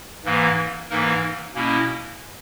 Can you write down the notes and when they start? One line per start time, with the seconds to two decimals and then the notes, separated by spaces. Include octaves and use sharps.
0.24 G#2 E3 A#3
0.90 G#2 E3 A#3 D#4 A#4
1.55 B2 A#3 C#4 E4